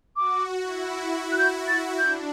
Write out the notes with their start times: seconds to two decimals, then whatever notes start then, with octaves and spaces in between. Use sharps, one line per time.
0.16 F#4 D6
0.62 E4
1.32 F#6
1.38 G6
1.68 A6
1.98 D4 G6